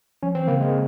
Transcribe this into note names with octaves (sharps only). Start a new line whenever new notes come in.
F3 C#4
E3 C4
C#3 A#3
G#3